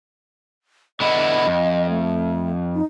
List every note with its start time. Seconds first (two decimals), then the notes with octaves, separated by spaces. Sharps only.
1.00 D3 B3 E4 D#5
1.47 F2
1.89 A3
2.75 D#4